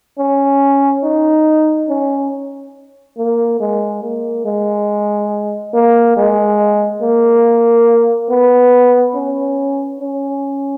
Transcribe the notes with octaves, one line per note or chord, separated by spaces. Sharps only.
C#4
D#4
C#4
A#3
G#3
A#3
G#3
A#3
G#3
A#3
B3
C#4
C#4